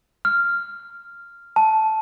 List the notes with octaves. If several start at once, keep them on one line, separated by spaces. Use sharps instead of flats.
F6
A5